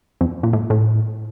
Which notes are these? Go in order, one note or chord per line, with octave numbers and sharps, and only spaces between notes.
F2
A#2
A2
A2